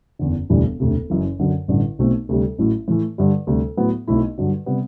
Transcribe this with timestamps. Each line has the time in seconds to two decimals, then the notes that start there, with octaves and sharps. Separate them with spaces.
0.19 F#1 E2 D3
0.50 E1 D2 C3 E3 G3
0.80 E1 D2 C3
1.10 F#1 F#2 E3
1.39 F#2 D3 F#3
1.68 A1 G2 D3
1.99 B1 B2 A3 C4
2.29 D2 C3 G3
2.58 A1 A2 F#3 A3 E4
2.88 A2 E3 A3
3.18 G2 D3 G3
3.47 D2 C3 G3
3.77 A2 F#3 B3
4.08 B1 B2 A3 C4 E4
4.38 G2 D3 F#3
4.66 C3 G3 B3